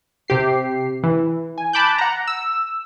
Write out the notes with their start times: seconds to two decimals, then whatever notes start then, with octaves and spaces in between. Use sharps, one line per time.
0.28 C3 G4 C7
1.03 E3
1.58 G#5
1.73 A5 B5 D6 F#6 G6
1.98 F#5 A#5
2.27 E6